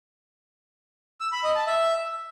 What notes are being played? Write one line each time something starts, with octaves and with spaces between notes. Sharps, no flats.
E6
B5
D#5
A5
E5